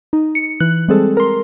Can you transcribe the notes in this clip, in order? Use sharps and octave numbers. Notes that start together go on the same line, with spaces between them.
D#4
C#7
E3 F#6
G3 G#3 C4 G#4 A4
A#4 C6